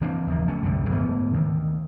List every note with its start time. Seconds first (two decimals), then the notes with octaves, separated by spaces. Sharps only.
0.01 E3 A#3 C4 D4
0.27 F#1 D#2 F3 A#3
0.47 D2 A3 C#4
0.62 C2 F#2 D3 G3
0.90 G#2 B2 E3 A3
1.33 D2 D#3